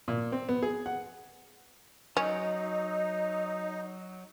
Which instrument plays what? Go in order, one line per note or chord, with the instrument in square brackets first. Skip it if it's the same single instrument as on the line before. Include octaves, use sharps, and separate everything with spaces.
[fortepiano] A#2
C4
B3
G#4
F#5
[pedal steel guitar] F#3 [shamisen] C#4 [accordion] D#4 [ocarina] D#5